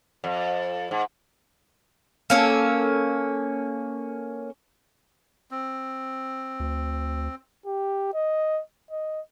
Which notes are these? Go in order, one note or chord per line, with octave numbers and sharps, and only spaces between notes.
F2
G#2
A#3 C#4 A4
C4
D2
G4
D#5
D#5